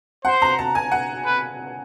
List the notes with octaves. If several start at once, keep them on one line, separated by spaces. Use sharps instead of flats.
C5 F#5
A#5
A5
G#5
F#5
B4